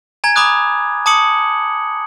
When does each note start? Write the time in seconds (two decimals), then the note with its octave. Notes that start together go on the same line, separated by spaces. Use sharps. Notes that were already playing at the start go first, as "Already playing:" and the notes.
0.24 G#5 A#5 G#6
0.36 A#5 B5 D6 D#6 F#6
1.06 A5 D6 D#6 C#7 F#7